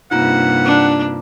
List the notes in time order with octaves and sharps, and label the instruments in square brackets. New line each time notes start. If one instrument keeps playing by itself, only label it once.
[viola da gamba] G2 C3 A#3 [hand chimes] D#4 F4 A#5 [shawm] F#5
[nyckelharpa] D4